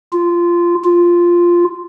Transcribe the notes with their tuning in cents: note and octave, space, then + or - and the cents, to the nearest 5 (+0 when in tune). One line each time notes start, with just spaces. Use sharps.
F4 -15
F4 -5